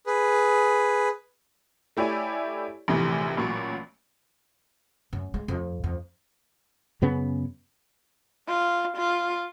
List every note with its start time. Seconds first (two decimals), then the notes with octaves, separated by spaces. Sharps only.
0.06 G#4 B4
1.97 A3 E4 G4 C#5 D5 G#5
2.88 A#1 A2 C3 D#3 E3
3.37 A1 A#2 F#3 C#6
5.13 F#2
5.34 G#3
5.48 F2
5.84 F2
7.02 F#2 C#3 B3 C#4
8.49 F4
8.97 F4